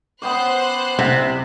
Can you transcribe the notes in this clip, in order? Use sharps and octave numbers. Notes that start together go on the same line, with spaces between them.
B3 C#4 C5 G5 D6 F#6
C2 C3 C4 F#5